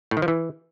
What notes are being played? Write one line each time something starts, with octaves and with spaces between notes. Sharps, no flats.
A2
D#3
F3
E3